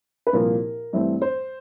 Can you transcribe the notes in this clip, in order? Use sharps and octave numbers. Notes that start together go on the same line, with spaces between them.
B4
C2 A#2 F3 A#3 A#4
G2 E3 A3 C4
C5